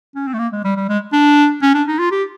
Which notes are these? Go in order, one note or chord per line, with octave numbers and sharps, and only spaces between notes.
C#4
C4
A3
A#3
G#3
G3
G3
G#3
D4
C#4
D4
D#4
F4
G4